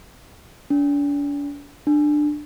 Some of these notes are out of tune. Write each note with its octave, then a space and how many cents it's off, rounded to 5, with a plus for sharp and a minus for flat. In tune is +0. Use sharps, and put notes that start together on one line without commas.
D4 -40
D4 +15